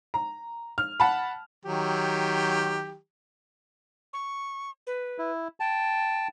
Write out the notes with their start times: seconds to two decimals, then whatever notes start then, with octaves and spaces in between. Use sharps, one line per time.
0.14 A#5
0.78 F6
1.00 F#5 A5 B5
1.65 D#3 F#3 G4
4.13 C#6
4.87 B4
5.18 E4
5.60 G5 A5